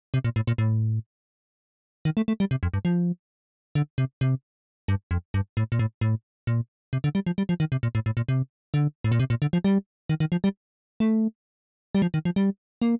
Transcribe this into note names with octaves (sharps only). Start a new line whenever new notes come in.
C3
A#2
A2
A#2
A2
D#3
A3
A3
G3
C3
F2
G2
F3
D3
C3
C3
G2
F2
G2
A2
A#2
A2
A2
A#2
C3
D3
G3
F3
G3
F3
D#3
C3
A#2
A2
A2
A#2
C3
D3
A2
A#2
C3
A#2
D3
F3
G3
D#3
D#3
F3
G3
A3
G3
F3
D#3
F3
G3
A#3